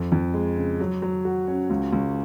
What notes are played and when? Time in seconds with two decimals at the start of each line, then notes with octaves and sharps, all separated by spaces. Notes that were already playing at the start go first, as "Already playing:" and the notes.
Already playing: F2
0.12 F2
0.34 G#3
0.57 C#3
0.80 F#3
1.02 F#3
1.25 F#4
1.48 C#4
1.70 C#2
1.93 C#2